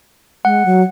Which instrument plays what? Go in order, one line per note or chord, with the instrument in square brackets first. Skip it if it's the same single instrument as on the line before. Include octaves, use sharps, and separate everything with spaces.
[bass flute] G#3 [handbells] F#5
[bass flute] F#3